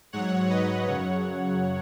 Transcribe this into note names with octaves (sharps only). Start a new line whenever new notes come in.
G#2 F#3 C#5 F#5
B4 D#5
F#2 C#3 F#3 C#5 F#5